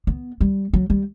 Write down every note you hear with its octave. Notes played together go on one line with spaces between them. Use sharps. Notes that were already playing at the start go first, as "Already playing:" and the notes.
B3
G3
F#3
G3